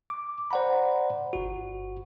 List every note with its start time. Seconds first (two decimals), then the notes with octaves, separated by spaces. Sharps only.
0.10 D6
0.51 C5 D5 F#5 A#5 B5
1.33 G1 F#4